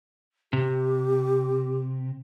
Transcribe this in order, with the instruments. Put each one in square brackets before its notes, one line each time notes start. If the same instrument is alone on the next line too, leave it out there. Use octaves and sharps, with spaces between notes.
[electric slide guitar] C3 [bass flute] G4